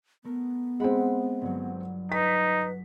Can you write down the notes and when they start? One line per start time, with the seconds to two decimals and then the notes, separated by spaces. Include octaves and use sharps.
0.24 A3 B3 A#4
0.80 G#3 C4 F#5 B5 D7
1.42 G1 F#3
2.12 D#4 B4 B6